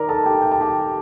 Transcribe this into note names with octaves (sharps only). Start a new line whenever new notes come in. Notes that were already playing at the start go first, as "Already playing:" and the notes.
Already playing: D#3 A#4 D5 D#5 A#5
A4 A5
G4 G5
G5
A5
G4 G5